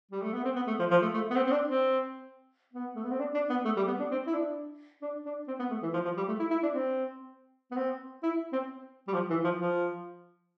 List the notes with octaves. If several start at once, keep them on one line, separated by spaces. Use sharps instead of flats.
G3
A3
B3
C4
B3
A3
F3
F3
A3
A3
B3
C4
C4
D4
C4
B3
A3
B3
C4
D4
D4
B3
A3
G3
B3
D4
C4
E4
D4
D4
D4
C4
B3
A3
E3
F3
F3
G3
A3
E4
E4
D4
C4
B3
C4
E4
C4
G3
F3
E3
F3
F3